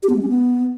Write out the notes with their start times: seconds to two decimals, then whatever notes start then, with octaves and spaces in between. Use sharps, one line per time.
0.03 G4
0.09 B3
0.16 G#3
0.22 C#4
0.29 B3